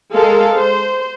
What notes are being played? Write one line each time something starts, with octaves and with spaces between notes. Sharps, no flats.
G#3 A4 A#4 F5
C5